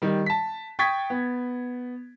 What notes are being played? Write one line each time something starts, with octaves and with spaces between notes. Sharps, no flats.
D#3 G3
A5 B6
G5 C#6 D#6 G#6 A6 B6
B3